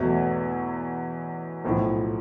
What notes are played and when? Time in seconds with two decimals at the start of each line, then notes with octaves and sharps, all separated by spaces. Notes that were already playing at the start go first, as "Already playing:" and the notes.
Already playing: E2 B2 F#3 A3
1.65 B1 A2 F3